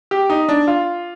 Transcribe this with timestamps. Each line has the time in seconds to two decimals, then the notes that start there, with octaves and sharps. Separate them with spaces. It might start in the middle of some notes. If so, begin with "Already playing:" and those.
0.11 G4
0.29 D#4
0.49 D4
0.67 F4